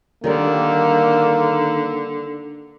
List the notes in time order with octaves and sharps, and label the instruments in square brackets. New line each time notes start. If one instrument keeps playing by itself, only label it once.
[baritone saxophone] D3 [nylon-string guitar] D#3 G3 A#4 [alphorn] A#3